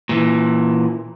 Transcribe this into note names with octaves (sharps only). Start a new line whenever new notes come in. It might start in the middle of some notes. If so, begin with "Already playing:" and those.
A#2 E3